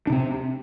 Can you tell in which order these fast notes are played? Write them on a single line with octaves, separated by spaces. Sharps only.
D4 C3 C4